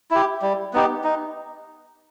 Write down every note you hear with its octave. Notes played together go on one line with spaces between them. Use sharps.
E4 G4
G3
B3 D#4 G4
D#4